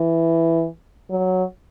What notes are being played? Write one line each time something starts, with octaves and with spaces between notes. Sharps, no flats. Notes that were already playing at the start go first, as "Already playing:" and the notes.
Already playing: E3
F#3